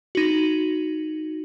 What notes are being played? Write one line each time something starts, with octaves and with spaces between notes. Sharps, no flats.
D#4 F#4